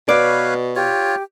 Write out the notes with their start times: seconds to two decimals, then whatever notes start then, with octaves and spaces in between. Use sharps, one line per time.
0.09 B2 B4 C#5 D5 F5
0.76 F4 G4 C#5